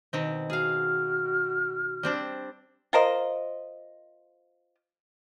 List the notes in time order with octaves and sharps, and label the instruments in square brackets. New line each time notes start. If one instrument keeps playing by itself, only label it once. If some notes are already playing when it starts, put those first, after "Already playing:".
[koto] B2 D#3 C4
[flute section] F#4 F6 [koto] G#4 F5
[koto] G3 C4 D4
[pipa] F4 A#4 C5 D#5